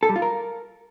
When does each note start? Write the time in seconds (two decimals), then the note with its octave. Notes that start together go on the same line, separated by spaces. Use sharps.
0.03 A4
0.09 G3
0.16 F4
0.22 A#4